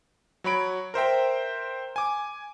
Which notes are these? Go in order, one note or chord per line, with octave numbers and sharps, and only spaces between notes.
F#3 C#5 B5 D7
A#4 C5 E5 G5
G#5 D6